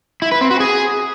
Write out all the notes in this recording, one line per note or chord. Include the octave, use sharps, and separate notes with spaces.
E4
B4
C4
F#4
G#4